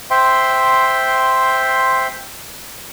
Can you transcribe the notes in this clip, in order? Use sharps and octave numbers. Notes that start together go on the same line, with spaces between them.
C5 E5 G5 C6